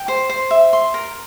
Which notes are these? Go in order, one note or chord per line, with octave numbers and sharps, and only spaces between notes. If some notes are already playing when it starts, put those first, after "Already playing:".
Already playing: G5
C5
C5
E5
C6
A#4